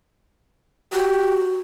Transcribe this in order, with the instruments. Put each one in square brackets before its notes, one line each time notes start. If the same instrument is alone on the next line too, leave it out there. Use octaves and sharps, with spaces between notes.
[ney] F#4 [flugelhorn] G4